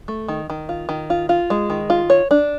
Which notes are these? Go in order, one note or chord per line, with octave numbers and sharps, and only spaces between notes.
A3
D#3
D#3
F4
D#3
F4
F4
G#3
D#3
F4
C#5
D4